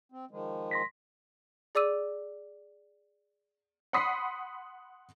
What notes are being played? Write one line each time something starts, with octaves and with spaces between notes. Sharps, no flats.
C4
D#3 F3 G#3
C6 A#6 B6
G#4 D5 D6 E6 D#7
F#5 B5 C6 D#6 B6 C7